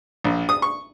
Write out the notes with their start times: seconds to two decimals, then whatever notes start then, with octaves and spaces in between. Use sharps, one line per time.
0.24 A#1
0.49 D#6
0.62 C#6